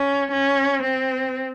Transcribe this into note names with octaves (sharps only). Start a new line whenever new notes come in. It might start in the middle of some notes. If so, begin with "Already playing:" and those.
Already playing: C#4
C#4
C4